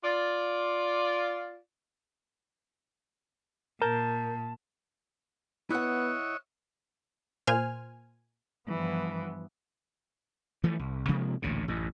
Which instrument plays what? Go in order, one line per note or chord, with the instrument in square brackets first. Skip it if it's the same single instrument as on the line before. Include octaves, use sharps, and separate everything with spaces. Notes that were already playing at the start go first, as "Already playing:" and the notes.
[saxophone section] F4 D5
[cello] A#2 [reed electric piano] A#4 G6 [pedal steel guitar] A5
[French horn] B3 [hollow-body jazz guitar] E4 F#5 [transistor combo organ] C#5 D#5 E5 [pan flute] F#6
[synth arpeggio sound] A#2 C5 G#5 F6
[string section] G2 F3 B3 [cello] E3
[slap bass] E3 F3 A3
C2
C3 F3 G#3 A#3
A1 D2 A#2 C#3
A1 F#2